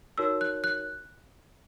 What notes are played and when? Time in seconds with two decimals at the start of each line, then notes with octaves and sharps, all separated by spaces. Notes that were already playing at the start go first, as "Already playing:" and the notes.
0.18 D#4 F#4 A#4 C#5 E6
0.41 F#6
0.64 F#6